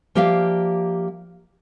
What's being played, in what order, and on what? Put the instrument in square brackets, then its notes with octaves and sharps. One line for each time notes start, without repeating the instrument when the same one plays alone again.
[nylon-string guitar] F3 A#3 G4 D5 E5 F5